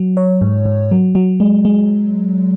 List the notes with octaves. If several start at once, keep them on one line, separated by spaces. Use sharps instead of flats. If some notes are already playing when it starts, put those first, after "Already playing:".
Already playing: F#3
C#5
G#2
G#2
F#3
F#3
G#3
G#3